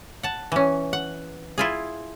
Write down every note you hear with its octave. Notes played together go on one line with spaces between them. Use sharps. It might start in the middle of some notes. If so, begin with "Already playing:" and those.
F#5 A5
E3 C#4
F#5
E4 F4 G#4